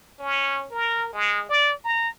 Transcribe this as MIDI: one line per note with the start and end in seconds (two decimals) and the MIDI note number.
0.20 0.66 61
0.71 1.10 70
1.13 1.46 56
1.49 1.72 74
1.84 2.08 82